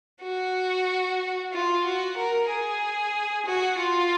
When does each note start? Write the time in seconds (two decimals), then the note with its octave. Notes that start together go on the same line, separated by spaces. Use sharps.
0.22 F#4
1.53 F4
1.85 F#4
2.17 A#4
2.49 G#4
3.46 F#4
3.78 F4